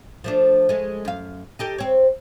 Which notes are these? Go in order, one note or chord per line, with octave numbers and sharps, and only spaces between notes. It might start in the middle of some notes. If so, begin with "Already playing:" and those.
F3 A3 D4
G#3 A3
F#2 F5
D#4 G4 A4
C4 C#5